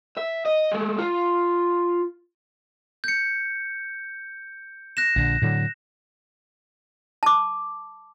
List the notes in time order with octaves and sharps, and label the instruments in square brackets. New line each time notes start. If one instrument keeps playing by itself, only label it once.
[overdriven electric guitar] E5
D#5
G#3 A3
F4
[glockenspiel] G6 C#7
F#6 A#6 E7
[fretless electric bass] A#1 D3
A2 D3 F#3
[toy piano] A5 D6